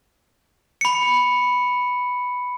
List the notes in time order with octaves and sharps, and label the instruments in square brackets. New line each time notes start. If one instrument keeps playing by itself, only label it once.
[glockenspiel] B5 C#7